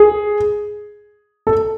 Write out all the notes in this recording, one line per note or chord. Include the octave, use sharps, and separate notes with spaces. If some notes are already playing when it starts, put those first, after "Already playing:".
Already playing: G#4
A4